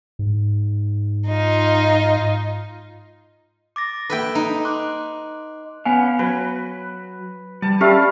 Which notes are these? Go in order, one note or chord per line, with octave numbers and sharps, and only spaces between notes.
G#2
D#4 F4
D6 A6 A#6
A#3 A4 B4 E5 G5
D#4
C6 D6 F#6
B3 C#4 F5 G#5
F#3 B4
G3 A5
G3 A3 C#4 G4 F5